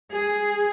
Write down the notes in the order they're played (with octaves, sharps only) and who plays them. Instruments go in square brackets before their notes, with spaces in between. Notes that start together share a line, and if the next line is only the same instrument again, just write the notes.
[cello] G#4